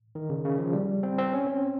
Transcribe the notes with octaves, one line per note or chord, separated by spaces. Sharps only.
D#3
C#3
C#3
F3
G3
C4
C4
C#4
C4